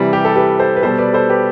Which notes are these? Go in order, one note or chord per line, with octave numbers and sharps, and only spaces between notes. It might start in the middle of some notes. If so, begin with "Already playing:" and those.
Already playing: C3 E3 G3
G4
A4
G4 B4
A4 C5
B4
B2 G3 A4 C5
B4 D5
A4 C5
G4 B4